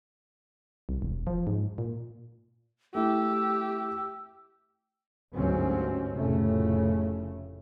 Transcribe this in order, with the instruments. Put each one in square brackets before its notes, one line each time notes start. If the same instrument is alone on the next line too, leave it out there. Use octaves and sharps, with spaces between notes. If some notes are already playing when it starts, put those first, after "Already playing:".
[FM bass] C2
E1
F3
G#2
A#2
[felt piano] A3 E4 [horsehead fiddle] G4 [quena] E6
[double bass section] G1 D2 G#2 F#3 C4 C#4
F1 A2 C#3 A3